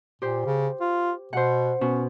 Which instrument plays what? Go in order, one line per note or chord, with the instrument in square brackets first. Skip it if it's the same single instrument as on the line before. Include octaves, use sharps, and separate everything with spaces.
[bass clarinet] A#2 [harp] G4 C5
[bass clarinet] C#3
F4
[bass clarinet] B2 [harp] C5 F#5
[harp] B2 [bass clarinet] C#4